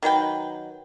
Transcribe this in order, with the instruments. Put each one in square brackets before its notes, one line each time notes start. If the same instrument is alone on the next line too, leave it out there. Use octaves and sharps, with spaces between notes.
[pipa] D#3 F#3 B4 G5